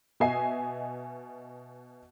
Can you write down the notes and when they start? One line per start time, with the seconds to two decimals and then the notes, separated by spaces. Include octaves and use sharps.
0.20 B2 D#5 E5 G#5 C7